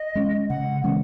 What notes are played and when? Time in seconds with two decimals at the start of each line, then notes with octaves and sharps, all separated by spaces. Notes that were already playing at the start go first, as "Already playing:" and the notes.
Already playing: D#5
0.15 G#3 C#4
0.50 C#3 F#5
0.84 E3 G#3 C#4